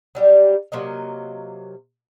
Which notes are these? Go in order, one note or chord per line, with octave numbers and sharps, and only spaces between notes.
F#3 G3 G4
C3 F#3 A#3 D#5